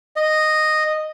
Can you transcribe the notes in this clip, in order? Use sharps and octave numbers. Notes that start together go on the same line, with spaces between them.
D#5